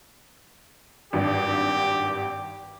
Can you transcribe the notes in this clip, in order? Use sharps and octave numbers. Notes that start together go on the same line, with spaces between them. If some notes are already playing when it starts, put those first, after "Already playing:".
G#1 G2 G4